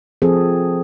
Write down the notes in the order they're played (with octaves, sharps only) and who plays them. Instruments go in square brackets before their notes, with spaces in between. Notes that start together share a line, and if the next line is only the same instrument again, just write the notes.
[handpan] F3 C4 G#4 A4